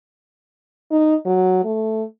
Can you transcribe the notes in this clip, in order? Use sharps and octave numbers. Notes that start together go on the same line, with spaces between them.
D#4
F#3
A3